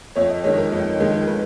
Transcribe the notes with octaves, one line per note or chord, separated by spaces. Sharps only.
F2 C#5
D#5
D#3 G#3 C#5
A#4
F2
D#3 G#3
B4